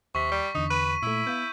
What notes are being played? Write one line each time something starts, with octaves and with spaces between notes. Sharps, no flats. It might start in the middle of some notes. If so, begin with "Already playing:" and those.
D#2 C3 C#6 B6
G3
E2 D3 D#4
B4 D#7
A#2 A3 E4
B3 F5 G6